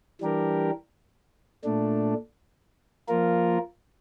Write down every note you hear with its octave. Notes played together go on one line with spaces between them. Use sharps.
E3 G3 D4 G4 A#4
A#2 A3 D4
F3 A#3 F4 A#4